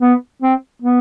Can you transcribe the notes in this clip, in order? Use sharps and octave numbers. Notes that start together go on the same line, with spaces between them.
B3
C4
B3